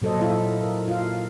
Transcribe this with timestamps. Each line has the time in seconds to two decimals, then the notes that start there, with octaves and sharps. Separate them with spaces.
0.02 A#2 F#3 A4 C5 D#5
0.21 E4 F4 A4 E5
0.63 A#4
0.88 F4 F5